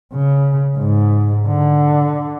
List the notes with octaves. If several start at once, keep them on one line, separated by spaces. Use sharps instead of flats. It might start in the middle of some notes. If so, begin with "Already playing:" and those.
C#3
G#2
D3